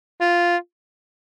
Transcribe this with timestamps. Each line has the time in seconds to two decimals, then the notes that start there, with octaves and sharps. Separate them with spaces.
0.21 F4